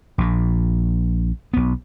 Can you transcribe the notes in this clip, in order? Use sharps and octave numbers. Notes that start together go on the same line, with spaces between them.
A#1 A#2
B1 B3